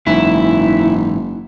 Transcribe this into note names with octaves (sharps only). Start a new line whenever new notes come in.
F#1 G#2 E3 D#4 E4